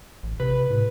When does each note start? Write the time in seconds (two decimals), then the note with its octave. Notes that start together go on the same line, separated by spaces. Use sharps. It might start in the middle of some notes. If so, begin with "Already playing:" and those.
0.23 A1
0.40 C3 B4
0.70 A2